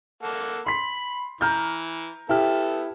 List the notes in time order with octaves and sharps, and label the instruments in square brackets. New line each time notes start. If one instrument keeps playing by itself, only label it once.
[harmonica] A#3 A4 F#5
[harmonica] B5 [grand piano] C6 B6
[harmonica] E3 [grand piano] A#5 F6 G6
[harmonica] B3 A4 [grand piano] E4 G4 F6